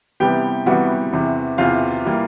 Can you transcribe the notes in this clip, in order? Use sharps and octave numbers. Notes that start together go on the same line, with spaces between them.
C3 E3 G3 B3 G4 G5
C3 E3 G3 B3 F#4 F#5
E2 C3 E3
E2 C3 E3 F4 F5
E3 G3 A#3